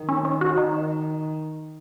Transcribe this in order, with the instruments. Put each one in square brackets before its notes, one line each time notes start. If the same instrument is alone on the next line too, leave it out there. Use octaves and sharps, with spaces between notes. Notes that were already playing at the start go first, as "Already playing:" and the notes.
Already playing: [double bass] D#3
[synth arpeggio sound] C#4
C#4
F#4
[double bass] D#3 [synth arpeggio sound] D#4